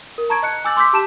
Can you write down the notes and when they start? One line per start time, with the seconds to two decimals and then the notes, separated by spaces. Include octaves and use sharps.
0.18 A#4
0.30 A5 A#5 C#6 G#6 D7
0.43 D#5 F#6 C#7
0.64 G#5 D6 E6 G6 A6 F#7
0.77 C6 D6 E6 G6 B6
0.93 G4 A5 G6 E7